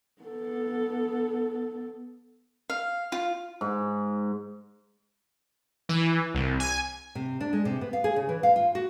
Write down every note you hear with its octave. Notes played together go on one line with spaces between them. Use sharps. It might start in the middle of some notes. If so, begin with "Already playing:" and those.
B3 A4
F5
F4
G#2
E3
C2
G#5
C3
D4
G#3
C3
B3
F5
G#4
C#3
E3
F5
F4
F#4